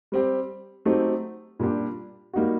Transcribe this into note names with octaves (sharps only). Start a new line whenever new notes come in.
G3 C4 G4
F#3 A3 C4 D#4 G4
A#2 G3 D4 G4
G3 A#3 D#4 F#4